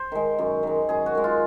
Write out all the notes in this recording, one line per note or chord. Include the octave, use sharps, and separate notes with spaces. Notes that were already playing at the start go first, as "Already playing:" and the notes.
Already playing: C5
D#3 G#3
F#2
D#3 G#3
F#2 G#4
F#4
D#3 G#3
F4